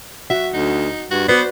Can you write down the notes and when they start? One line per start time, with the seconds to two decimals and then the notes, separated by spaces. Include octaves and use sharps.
0.30 F#4 E5 F#5
0.54 D2 D#4
1.11 G2 F#4
1.28 B3 F#4 B4 C5 D5